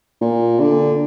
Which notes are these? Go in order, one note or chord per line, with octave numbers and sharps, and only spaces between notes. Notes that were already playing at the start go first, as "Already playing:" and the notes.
A#2
D3